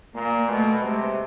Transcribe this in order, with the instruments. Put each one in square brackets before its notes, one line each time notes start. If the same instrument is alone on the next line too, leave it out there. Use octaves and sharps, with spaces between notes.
[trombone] A#2 [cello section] A#3
[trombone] B2 [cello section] A3
[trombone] C3 [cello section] G#3